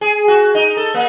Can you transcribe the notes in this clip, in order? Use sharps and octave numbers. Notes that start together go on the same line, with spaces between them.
G#4
F#4
D#4
A4
A#3